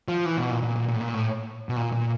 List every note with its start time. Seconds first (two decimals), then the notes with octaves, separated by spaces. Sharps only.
0.08 F3
0.26 E3
0.37 B2
0.51 A#2
0.63 A#2
0.76 A#2
0.88 A#2
0.95 A2
1.00 A#2
1.14 A2
1.69 B2
1.76 A#2
1.92 A#2